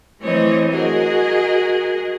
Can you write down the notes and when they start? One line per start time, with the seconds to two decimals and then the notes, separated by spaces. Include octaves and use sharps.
0.20 E3 A3 C4 C#5 D#5
0.70 F#4 G#4 A#4 D#5